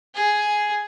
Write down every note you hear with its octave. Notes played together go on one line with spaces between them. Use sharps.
G#4